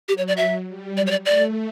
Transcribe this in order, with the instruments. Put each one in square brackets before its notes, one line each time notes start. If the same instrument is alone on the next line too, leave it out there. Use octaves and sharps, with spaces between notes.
[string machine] F#3 [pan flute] G4
[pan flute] C#5
D5
[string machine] F#3 [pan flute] E5
[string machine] G3
[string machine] F#3 [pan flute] D5
[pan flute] C#5
D5
[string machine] A3 [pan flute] D5